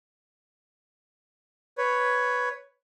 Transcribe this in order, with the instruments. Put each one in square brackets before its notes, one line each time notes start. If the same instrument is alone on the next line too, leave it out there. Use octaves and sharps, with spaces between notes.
[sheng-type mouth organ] B4 C#5